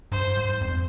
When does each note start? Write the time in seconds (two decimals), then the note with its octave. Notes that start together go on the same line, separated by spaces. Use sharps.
0.12 G2 C5
0.37 G#2
0.61 F2